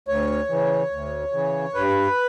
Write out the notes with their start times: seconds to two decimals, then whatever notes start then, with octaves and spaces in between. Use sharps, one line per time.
0.08 D2 C#5
0.50 C#3 E3
0.91 D2
1.33 C#3 E3
1.74 G2 B4